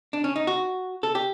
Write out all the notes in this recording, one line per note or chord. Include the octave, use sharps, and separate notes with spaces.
D4
C#4
D#4
F#4
A4
G4